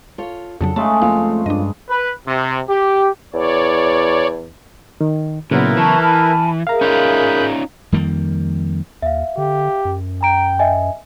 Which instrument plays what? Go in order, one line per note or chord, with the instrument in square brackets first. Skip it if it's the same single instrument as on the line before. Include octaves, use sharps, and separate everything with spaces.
[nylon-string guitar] F4 A4 C#5
[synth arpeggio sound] F2 C#3 F#3 [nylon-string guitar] D4 [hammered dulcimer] A4
[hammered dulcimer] C#3 G#3 [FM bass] A3 [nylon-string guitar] D#4 E5 [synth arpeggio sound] A5
[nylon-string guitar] F2 F4 A4 [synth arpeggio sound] A#3
[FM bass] G2 [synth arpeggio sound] D4 D#5
[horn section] B4
C3
G4
[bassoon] E2 [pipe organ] C#5 D5
[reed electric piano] D#3
[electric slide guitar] A#2 [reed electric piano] C#3 F#3 B3 [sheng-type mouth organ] E4 A#4 B4
[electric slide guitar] E3 [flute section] A5 A#5 C#6
[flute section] G#5 A5 B5 [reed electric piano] F6
[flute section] G#4 A#4 E5 [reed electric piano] F5 A#5
[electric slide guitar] C#4 D#4 F4 [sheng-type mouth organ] B5 F#6 G6
[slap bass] F2 D#3 G3 A#3
[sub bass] D#2 [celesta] E5 F5
[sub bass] D3 [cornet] G4
[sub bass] F#2
[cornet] G5 [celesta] A#5 D7
[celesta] D#5 E5 G#5